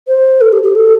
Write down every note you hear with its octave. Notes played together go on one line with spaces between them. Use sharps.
C5
A4
G4
G4
A4